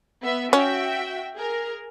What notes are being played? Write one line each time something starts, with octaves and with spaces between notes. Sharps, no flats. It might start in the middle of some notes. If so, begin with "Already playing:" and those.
B3 E5
C#4 F#4 E5 G5
G#4 A#4